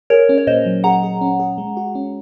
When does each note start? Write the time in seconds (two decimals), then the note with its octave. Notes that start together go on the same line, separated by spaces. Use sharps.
0.10 G#4 A#4 C#5
0.29 C#4
0.38 C#5
0.47 A#2 C5 D#5
0.66 F#3
0.84 G#4 F#5 A#5
1.03 G#4
1.21 C#4
1.39 G#4
1.58 G#3
1.77 F#4
1.95 C#4